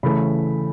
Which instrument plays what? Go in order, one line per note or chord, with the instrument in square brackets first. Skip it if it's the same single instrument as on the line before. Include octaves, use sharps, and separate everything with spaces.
[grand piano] C#3 E3 A3 B5